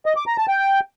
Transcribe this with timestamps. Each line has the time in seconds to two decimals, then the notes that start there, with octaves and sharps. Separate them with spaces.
0.06 D#5
0.16 D6
0.27 A#5
0.38 A5
0.48 G5